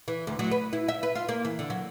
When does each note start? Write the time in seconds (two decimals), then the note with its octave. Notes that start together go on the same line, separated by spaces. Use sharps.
0.08 E3
0.27 D2
0.39 F#3
0.51 B4
0.73 E4
0.88 E5
1.03 B4
1.15 F4
1.29 A#3
1.45 E3
1.59 D3
1.70 F#3